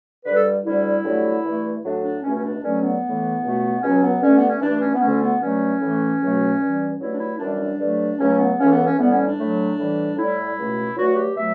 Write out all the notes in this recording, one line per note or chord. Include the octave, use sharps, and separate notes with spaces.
G2 D3 G3 B4
A4
D2 D3 G3 E4
G2 D3 F#3 A3
G2 E3 A3
A2 F#3 A3 D4
D4
C#2 B2 A3 C#4
C#4
D4
G2 D3 F#3 A3 C#4
B3
A2 E3 A3
C#2 B2 A3
C#2 B2 F#3 C#4
B3
G2 D3 A3 C#4
B3
C#4
G2 E3 A3 D4
C#4
B3
D2 D3 A3 C#4
B3
G2 F#3 A3 C#4
A2 E3 A3
C#2 B2 F#3 A3
G2 E3 G3
G2 F#3 A3 E4
D4
E4
F#2 E3 G3 D4
D4
G2 D3 F#3 A3
C#2 C#3 F#3 A3 C#4
B3
C#2 C#3 E3 A3 C#4
B3
C#4
A2 E3 G3 B3
C#4
D4
A2 F#3 A3
A2 E3 G3
A2 G3 E4
C#2 B2 A3
G2 F#3 A3 F#4
G4
B2 F#3 A3 E5